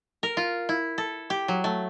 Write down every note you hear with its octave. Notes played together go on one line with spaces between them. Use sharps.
A#4
F4
E4
A4
G4
F#3
A3